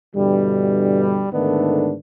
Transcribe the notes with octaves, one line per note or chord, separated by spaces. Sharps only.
G2 B2 D3 E3 G3
G#2 D3 D#3 A3 B3 D4